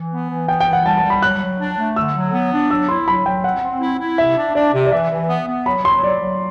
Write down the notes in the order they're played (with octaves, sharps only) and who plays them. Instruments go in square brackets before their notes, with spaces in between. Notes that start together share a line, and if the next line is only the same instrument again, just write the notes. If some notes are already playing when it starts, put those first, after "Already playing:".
Already playing: [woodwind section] E3
B3
E3
[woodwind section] B3 [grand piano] G5
[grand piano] G5
[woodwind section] E3
[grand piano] F#5
[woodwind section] G3 [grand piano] A5
[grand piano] A5
[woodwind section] G3
[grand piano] B5
[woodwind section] F#3 [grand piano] F#6
[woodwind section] F#3
D4
A3
[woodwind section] D3 [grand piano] E6
[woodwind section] F#3
B3
D4
[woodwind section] F#3 [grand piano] E6
[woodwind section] E4 [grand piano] C6
[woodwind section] F#3 [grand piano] B5
[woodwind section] F#3 [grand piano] G5
[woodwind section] C4 [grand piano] F#5
[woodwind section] C4
E4
E4
[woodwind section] C3 [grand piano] E5
[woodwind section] D4
[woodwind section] D4 [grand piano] D5
[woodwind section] C3
[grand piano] D5
[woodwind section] E3 [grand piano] E5
[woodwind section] E3
B3
B3
[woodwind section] F#3 [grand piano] B5
[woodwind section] F#3 [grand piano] C6
[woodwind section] F#3 [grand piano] D5
[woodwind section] F#3